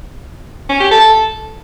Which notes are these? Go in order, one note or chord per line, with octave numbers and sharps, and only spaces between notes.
C#4
G4
A4